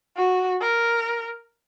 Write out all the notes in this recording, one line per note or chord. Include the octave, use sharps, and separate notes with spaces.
F#4
A#4